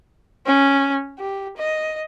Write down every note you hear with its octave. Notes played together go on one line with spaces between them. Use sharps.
C#4
G4
D#5